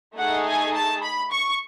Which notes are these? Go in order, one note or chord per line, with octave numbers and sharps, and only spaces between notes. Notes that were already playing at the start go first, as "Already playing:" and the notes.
A3 D#4 G#4 F#5
G#5
A5
B5
C#6